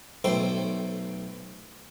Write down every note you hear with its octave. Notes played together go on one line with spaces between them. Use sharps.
B1 A3 C5 G5